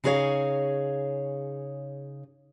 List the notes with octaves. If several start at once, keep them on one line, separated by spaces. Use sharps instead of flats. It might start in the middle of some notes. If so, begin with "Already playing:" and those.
C#3 D#4 G#4 B4 C#5 F5